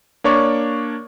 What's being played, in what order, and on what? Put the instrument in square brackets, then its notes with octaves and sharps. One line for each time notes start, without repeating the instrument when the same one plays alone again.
[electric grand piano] A#3 D4 C#5 D5 C#6